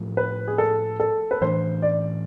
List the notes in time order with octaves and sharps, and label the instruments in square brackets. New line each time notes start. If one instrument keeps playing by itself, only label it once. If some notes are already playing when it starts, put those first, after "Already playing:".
Already playing: [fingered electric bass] A2 F3 A3
[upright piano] B4
G#4
A4
A4
B4
[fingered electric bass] A2 E3 A3 D4 [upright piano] C5
[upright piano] D5